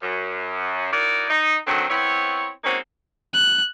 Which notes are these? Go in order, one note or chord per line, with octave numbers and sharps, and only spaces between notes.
F#2
D#4 E4 F#4 A#4 D5
D#4
D3 D#3 F#3 C4
B3 C4 E4 C#5
G#3 A#3 C4 C#4 D#4 F#4
F#6